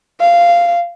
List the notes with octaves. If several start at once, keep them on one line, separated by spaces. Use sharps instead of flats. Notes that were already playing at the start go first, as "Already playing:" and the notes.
F5